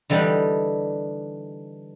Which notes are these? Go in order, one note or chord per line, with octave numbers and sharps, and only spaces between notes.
D3 E3 G3 D4 D#4